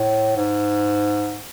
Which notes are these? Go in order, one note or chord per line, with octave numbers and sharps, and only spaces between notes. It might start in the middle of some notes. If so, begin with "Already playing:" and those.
Already playing: A2
G#2